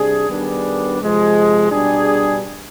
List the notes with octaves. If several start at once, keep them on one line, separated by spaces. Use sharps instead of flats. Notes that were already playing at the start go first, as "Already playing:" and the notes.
Already playing: C3 G3 D4 G#4
D#3 G3 B3 D4 G#4
C3 F3 G#3
B2 G3 D4 G#4